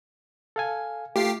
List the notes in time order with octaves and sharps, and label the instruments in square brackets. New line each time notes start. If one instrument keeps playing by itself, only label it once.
[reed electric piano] A4 F5 G#5
[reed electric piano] A3 F4 [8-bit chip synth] G4 C7